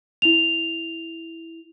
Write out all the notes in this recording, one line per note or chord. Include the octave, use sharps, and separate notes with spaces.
E4 F7